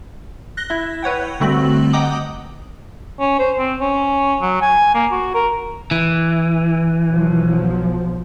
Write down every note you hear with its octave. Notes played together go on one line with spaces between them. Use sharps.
F#6 A#6 G7
E4 E5
B4 C#5 F#5 G5
D3 G3 A3 C4 F#4 F#7
D#5 F#5 G5 A#5 D6 D#6
C#4
C5
C4
C#4
F#3
G#5
A#3
F#4
A#4
E3
B1 F3 F#3